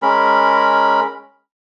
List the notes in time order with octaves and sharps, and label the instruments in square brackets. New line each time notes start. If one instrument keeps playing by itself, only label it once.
[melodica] G#3 C#4 A#4 B5